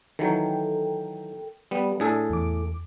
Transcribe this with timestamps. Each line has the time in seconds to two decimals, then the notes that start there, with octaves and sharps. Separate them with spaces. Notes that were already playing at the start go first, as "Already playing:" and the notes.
0.19 D#3 E3 F#3 A4 A#4 G5
1.71 G3 B3
2.00 A2 D4 G#4 A4
2.30 E2 D6